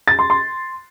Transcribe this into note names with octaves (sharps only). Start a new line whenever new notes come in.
A6
C6
C6